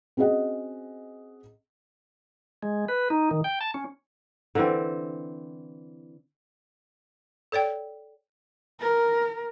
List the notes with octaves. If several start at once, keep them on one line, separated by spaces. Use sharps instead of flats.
C4 C#4 F#4 G#4 D#5 F#5
G#3
B4
D#4
D#3
G5
A5
C#4
D3 E3 C4
A4 C#5 D5 G5
A#4